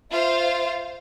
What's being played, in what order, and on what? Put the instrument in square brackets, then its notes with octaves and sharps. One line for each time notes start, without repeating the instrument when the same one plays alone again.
[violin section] F4 C5 F5 [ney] E5